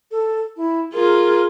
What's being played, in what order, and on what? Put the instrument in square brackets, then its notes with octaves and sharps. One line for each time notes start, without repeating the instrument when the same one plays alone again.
[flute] A4
E4
[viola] F4 G#4 [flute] A#4